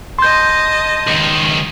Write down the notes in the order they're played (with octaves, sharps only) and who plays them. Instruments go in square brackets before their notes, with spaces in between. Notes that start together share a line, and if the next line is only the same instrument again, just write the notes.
[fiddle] D#5 A5 [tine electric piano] C6 G6
[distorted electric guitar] C#2 D#3